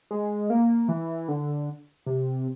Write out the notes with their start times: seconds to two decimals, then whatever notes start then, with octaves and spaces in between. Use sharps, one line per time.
0.11 G#3
0.50 A#3
0.89 E3
1.28 D3
2.06 C3